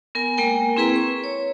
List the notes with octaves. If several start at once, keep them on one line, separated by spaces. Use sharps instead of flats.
B3 A#4 G#5
G#3 A#3 A#4 G5 G#5
C4 E4 G#4 B4 A#5
C#6
C#5